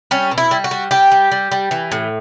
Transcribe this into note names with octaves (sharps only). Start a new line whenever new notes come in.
G3 C#4
B2
E4
G3
F#4
G3
G3 G4
G3
G3
G3
E3
A2